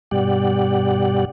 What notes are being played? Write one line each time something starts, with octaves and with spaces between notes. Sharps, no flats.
G2 B2 G3 G4 D5 F#5